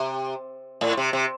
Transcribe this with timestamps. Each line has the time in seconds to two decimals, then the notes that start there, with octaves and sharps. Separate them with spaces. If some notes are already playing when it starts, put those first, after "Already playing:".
Already playing: C3
0.81 A2
0.97 C3
1.13 C3